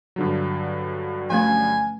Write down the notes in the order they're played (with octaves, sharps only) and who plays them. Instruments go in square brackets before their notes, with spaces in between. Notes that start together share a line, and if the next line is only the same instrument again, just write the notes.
[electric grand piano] G2 D3 F#3
[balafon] F3 A3 C#4 [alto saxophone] G#5